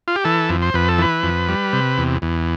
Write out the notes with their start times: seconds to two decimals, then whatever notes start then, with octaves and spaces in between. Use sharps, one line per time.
0.08 F4
0.16 G4
0.24 E3 A4
0.49 F2
0.62 C5
0.74 F2 B4
0.88 A4
0.98 E3 B4
1.24 F2
1.49 G3
1.73 C3
1.98 E2
2.22 E2